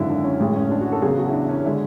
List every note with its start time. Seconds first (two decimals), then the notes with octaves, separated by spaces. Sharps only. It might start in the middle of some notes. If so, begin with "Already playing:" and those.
Already playing: G#1 F#2 D3 E4
0.09 D4
0.24 C#4
0.40 A1 A2 G#3
0.56 C#4
0.71 D4
0.81 F#4
0.92 A4
1.02 E2 C#3 F#3 G#4
1.18 F#4
1.29 E4
1.33 D4
1.49 C#4
1.65 D3 G#3 E4